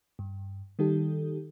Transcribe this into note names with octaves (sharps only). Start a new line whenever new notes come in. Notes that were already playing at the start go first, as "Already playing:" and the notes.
G2
D#3 G3 D#4 G4 A4